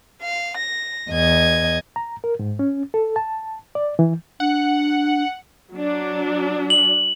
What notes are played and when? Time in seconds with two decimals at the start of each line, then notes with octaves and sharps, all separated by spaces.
0.21 F5
0.57 A#6
1.11 E2 D#5 G#6
1.96 A#5
2.24 A#4
2.39 G#2
2.59 C#4
2.94 A4
3.16 A5
3.75 D5
3.99 E3
4.40 D4 F#5
5.73 F#3 D4
6.70 F#7